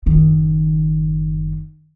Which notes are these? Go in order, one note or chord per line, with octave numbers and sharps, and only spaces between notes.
F#1 D#3